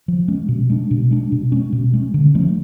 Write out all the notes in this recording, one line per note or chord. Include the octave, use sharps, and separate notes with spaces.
F3
G#3 C#4
B2
G#3 D4
B2
G#3 D4
B2
G#3 C#4
B2
G#3 C#4
D3
F3 A3 C#4